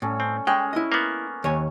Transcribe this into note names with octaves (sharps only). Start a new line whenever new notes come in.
A2 G3 C#4 A4
C4
G#3 C#4 G5
E4 D#5
A#3 B3
D#2 C#5 G#5